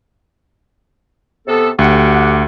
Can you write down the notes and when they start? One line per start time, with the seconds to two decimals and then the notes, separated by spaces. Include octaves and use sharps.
1.47 C3 B3 A4
1.79 D2 G4 F#5